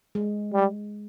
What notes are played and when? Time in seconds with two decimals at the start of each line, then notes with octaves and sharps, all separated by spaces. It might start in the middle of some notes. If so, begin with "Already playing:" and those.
0.15 G#3
0.53 G3